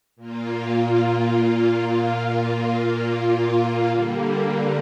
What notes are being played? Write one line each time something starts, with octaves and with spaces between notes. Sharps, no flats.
A#2 A#3 F4
D3 G3 A#3